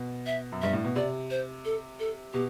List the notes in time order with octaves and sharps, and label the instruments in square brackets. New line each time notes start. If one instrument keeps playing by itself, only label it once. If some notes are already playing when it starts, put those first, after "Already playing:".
Already playing: [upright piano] B2
[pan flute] E5
[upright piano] F#2
[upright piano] G2 [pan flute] E5
[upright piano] A2
B2
[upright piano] C3 [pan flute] D5
[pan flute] C5
A4
A4
[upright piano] B2 [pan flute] G4